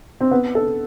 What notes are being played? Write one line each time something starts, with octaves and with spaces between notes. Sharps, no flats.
C4
B3
A4